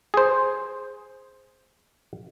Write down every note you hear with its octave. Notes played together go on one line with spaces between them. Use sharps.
G#4 C5